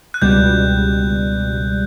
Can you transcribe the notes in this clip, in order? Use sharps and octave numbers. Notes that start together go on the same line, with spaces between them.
F#6
C#2 B2 G3 G6